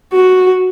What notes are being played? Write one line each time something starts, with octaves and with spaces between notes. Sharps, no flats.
F#4